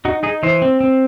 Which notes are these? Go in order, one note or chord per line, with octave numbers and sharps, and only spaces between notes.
D#4 F#4
D#4 G#4
E3 C5
C4
C4